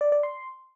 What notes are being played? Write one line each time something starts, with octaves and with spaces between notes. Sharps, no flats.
D5
D5
C6